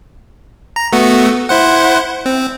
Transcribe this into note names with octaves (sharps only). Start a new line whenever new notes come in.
A#5
A3 B3 F#4
E4 C5 F#5
C4